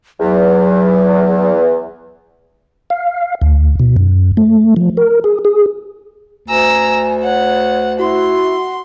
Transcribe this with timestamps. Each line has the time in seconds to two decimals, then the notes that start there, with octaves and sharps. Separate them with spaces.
0.20 E2 F#3
2.90 F5
3.41 D2
3.80 B2
3.96 F#2
4.37 A3
4.76 F3
4.97 A#4
5.24 G#4
5.45 G#4
6.49 D2 G#5 A#5 E6
7.23 C#5 F#5
7.99 E4 F#4 C6